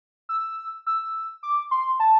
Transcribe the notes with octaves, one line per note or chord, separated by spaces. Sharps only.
E6
E6
D6
C6
A5